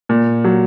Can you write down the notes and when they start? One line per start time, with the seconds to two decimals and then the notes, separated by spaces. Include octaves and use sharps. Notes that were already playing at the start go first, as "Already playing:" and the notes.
0.09 A#2
0.44 F#3